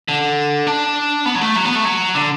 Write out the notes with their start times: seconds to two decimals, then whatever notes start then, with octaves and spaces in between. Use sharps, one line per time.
0.08 D3
0.67 D4
1.26 B3
1.35 F#3
1.41 A3
1.56 F#3
1.65 B3
1.75 A3
1.85 F#3
2.15 D3